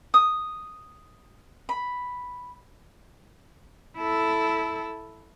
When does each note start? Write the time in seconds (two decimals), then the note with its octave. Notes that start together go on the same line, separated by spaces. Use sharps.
0.14 D#6
1.69 B5
3.98 E4 A4